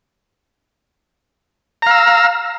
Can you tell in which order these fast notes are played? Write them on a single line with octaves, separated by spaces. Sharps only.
A#5 F5 E6